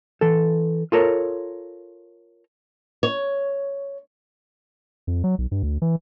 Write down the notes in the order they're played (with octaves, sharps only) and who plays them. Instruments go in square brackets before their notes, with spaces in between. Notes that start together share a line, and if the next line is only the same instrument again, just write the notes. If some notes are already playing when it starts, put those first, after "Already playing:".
[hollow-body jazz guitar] E3 A4
F4 A4 A#4 C#5
[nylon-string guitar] C#5
[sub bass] F2
F#3
B1
G2
D2
E3